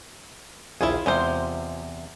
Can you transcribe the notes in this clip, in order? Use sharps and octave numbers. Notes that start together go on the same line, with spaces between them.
A#1 D#2 E4 F4 G#4
E2 C3 G#3 F4 C5